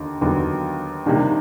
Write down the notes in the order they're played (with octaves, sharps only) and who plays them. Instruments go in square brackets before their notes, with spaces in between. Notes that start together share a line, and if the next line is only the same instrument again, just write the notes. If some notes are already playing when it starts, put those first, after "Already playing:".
Already playing: [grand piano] D#2 D3
D#2 D3 F#3 B3
C3 D#3 G3 A#3 D4